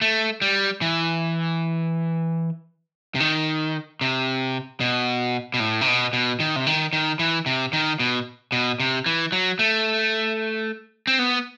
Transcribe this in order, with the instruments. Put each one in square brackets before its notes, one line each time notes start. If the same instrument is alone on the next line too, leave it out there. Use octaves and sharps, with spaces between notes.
[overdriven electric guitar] A3
G3
E3
C3
D#3
C3
B2
B2
A2
C3
B2
B2
D#3
C3
D#3
D#3
E3
C3
D#3
B2
B2
C3
E3
F#3
A3
C4
B3